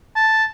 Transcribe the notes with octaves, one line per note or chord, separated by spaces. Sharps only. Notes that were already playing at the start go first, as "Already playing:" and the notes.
A5